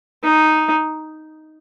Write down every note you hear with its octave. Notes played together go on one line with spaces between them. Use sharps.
D#4